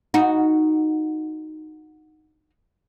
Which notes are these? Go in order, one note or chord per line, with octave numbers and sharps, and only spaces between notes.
D#4 F#4